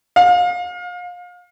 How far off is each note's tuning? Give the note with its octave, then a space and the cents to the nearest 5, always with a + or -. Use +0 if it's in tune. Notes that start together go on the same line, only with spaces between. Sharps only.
F5 +30